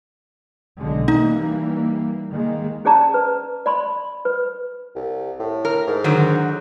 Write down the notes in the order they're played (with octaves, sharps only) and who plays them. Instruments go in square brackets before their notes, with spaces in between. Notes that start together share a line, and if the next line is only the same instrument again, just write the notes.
[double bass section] B1 D3 G#3
[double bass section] E3 G3 A#3 [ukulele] D#4
[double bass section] D#3 G#3 A#3
[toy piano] C#4 G#4 D5 A5 A#5
B4
D5 B5 C6
B4
[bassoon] C2
A2
[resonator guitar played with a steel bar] A#4
[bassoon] G#2
[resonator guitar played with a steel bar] D3 D#3 F#3